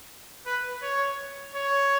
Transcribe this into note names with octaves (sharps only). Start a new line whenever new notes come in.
B4
C#5
C#5